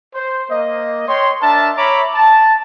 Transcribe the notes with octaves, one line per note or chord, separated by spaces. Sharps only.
C5
A#3 D#5
C#5 D#5 G5 C6
D4 A#4 E5 A5
C#5 E5 A#5 B5 D6
A5